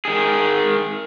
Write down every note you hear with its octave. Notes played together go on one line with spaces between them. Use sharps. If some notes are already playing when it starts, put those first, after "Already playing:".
D#3 G#4